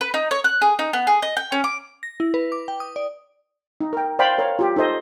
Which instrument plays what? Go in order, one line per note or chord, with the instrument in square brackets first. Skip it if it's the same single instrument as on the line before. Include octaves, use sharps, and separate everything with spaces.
[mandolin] B4
D#4
C#5
F#6
G#4
D#4
B3
G#4
D#5
G5
C#4
D6
[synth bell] A#6
E4
B4
D6
G5
D#6
D5
[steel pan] D#4
A#4 G5
C5 D5 F5 G5 B5
A#4 C#5 F5
F4 G4
D#4 A4 C5 D#5